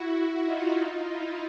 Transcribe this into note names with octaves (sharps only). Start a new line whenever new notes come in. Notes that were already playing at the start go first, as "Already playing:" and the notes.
Already playing: E4 F#4
D#4 F4
D#4 F4
E4